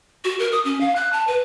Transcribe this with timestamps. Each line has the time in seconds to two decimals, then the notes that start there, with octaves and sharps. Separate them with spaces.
0.25 F#4
0.39 A#4
0.52 D#6
0.65 C#4
0.81 F5
0.96 F#6
1.13 A5
1.27 B4